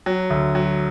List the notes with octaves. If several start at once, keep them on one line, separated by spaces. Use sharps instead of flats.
F#3
D2
F#3